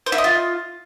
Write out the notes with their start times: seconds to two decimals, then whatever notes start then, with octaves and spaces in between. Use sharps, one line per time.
0.06 C5
0.12 E4
0.18 D#5
0.24 F4